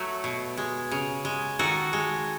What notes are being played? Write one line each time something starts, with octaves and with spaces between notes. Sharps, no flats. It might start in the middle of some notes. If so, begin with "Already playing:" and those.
Already playing: F#3 A3 F#4
B2
G#3
C#3
G#3
D#3 F#4 A4
G#3